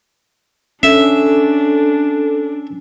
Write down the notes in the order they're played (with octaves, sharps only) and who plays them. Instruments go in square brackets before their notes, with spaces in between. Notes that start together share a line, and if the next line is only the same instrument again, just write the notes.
[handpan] C#4 [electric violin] D4 [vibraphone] A4 [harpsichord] E5